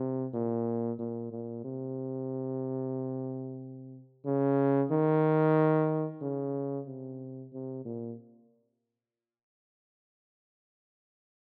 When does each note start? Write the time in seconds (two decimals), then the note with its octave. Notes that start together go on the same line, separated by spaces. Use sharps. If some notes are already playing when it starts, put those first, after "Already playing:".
Already playing: C3
0.34 A#2
0.99 A#2
1.31 A#2
1.64 C3
4.25 C#3
4.91 D#3
6.21 C#3
6.87 C3
7.53 C3
7.85 A#2